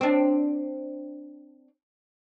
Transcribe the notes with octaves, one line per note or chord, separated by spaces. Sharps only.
C4 D4